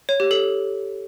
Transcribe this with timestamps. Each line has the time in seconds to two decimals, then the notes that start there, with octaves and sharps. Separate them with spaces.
0.09 C#5
0.20 G4
0.31 A4